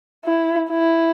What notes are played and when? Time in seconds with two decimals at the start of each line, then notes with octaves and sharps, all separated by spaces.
0.25 E4
0.70 E4